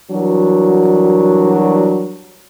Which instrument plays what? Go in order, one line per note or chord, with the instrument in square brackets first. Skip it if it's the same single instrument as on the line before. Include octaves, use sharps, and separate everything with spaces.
[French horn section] E3 F#3 G3 D4 F#4 A#4